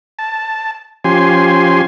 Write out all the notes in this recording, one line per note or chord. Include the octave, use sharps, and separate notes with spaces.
A5
F3 C#4 G4 G#5 C6